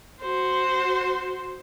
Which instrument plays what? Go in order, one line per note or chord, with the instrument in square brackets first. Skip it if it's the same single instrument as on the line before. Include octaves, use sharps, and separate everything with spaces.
[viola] F#4 C5